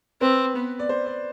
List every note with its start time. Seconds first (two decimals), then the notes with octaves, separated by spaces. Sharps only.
0.21 C4 B4
0.56 B3
0.79 D5
0.89 C5
1.06 D5